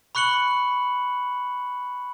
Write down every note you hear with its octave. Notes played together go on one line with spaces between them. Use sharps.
B5 C#6 F#6 C#7 F#7